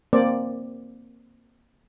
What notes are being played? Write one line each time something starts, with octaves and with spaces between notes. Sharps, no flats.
A#3 C4 C5 D5